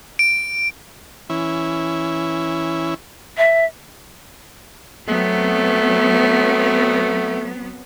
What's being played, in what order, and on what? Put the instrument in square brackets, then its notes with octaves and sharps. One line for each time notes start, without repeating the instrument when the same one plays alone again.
[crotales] D7
[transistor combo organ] E3 C#4 E4
[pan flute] E5
[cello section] F#3 B3 C4 [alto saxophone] A3